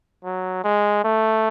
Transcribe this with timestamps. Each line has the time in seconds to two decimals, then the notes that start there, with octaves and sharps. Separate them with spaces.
0.24 F#3
0.64 G#3
1.04 A3